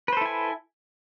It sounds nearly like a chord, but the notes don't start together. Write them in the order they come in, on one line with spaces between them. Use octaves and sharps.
B4 C5 A4 E4 G#5